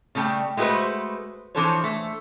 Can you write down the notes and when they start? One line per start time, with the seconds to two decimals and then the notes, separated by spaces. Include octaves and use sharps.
0.15 C#3 G3 A3 G5
0.57 G#3 A3 F#4 G4 B4 C5
1.55 E3 F3 D4 A4 C5 C#5
1.84 A3